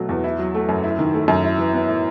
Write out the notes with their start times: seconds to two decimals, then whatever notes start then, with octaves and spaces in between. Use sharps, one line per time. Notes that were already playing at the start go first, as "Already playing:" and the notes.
Already playing: B2 F#3 A3
0.09 E2
0.24 E4
0.39 F#3
0.54 A3
0.69 F#2
0.84 E4
0.99 D#3
1.14 A3
1.28 F#2
1.43 E4
1.58 E3
1.73 B3
1.88 A2